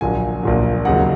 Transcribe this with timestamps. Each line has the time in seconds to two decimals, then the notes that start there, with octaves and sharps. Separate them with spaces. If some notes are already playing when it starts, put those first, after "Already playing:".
0.01 A#1 A#2 F#3 G#5
0.43 A#1 A#2 F#3
0.85 D#2 C#3 F#3 F#5